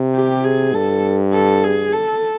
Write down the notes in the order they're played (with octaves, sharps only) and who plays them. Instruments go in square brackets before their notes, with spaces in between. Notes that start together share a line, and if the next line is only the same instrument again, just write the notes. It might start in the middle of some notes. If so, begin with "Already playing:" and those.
Already playing: [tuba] C3
[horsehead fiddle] G4
G#4
[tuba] G2 [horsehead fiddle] A4
[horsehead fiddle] A4
G#4
A4